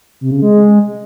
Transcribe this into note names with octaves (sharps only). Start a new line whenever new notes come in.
C3
C#3
G#3